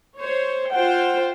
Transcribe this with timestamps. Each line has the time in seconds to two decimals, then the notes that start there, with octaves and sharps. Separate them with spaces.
0.18 C5 C#5
0.71 F4 C5 F#5 G5